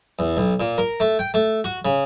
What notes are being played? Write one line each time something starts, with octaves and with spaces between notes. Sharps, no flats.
E2
B1
A#2
A#4
A3
G5
A3
F#4
C#3